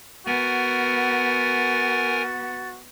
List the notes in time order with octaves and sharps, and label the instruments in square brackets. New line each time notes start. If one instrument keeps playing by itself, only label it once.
[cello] B3 [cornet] F#4 [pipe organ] A#4 G#5 [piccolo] A6